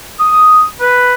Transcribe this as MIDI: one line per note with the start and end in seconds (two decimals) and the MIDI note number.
0.19 0.63 87
0.80 1.13 71